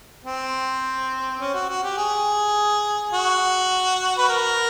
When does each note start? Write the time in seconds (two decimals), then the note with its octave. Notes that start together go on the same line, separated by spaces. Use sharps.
0.24 C4
1.39 C#4
1.55 F#4
1.69 F#4
1.83 G4
1.97 G#4
3.13 F#4
4.18 B4
4.29 A#4